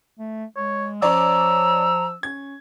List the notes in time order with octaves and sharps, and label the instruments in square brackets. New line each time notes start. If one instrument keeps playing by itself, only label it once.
[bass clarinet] A3
[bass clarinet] G#3 [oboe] C#5
[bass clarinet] F3 [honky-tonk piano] C#4 C#5 D5 [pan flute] A#5 [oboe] E6
[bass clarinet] C#4 [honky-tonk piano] G#6